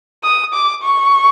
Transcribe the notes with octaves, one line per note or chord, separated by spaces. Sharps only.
D#6
D6
C#6